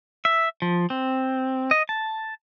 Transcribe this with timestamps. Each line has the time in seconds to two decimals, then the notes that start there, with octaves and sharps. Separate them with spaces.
0.25 E5
0.62 F3
0.90 C4
1.71 D#5
1.89 A5